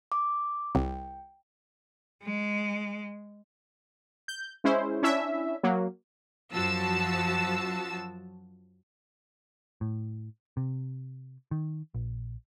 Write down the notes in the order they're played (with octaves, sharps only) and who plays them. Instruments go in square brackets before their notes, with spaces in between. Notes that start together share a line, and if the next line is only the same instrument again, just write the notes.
[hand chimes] D6
[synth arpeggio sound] C2 [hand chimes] G5
[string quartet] G#3
[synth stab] G6
G#3 C#4 E4 C5
C#4 D4 E4 E5
F#3 A#3
[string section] F#2 F3 F#4 A5 E6
[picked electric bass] A2
C3
D#3
A#1